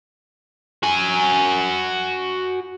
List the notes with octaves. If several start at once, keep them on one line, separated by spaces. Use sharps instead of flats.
F#4 G#5